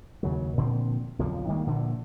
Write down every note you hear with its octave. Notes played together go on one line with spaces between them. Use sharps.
D#2 C#3 F#3
A#2 D3 F3 C4
B1 F2 D3 F3
D#3 G3 G#3 A#3
A#2 D3 E3 F3